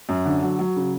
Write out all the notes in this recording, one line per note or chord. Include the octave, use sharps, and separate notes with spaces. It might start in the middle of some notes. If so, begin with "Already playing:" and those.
F#2
D3
F#3
F#3
C#3